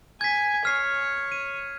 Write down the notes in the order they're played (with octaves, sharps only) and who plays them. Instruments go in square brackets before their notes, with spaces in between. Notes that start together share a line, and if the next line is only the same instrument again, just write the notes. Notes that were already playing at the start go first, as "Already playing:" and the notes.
[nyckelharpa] G#5 [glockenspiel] G#6 B6
[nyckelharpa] C#5 [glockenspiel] F6 C7
[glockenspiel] D#7